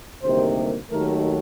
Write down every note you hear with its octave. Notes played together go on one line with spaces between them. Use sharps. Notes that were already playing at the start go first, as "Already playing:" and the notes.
D2 C3 D#3 G3 A#3 C5
D#2 D#3 F#3 A3 A#4